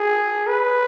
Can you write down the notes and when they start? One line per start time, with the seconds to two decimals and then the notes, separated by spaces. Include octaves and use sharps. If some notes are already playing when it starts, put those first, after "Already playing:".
Already playing: G#4
0.47 B4